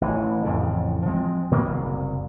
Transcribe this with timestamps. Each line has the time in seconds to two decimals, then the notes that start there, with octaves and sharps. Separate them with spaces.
0.01 A1 E3
0.45 A1 F2 A2 C#3
1.05 F3 G#3 C4
1.51 A#2 D#3 A#3 B3
1.66 F#1 C2